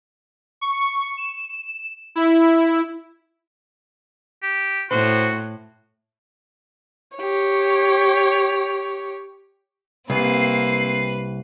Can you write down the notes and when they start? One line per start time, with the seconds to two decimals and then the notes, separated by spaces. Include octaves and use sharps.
0.61 C#6
1.17 E7
2.15 E4
4.43 G4
4.91 A2 F#4 C5
7.17 G4 C#5
10.10 C2 A#3 C4 B4 C7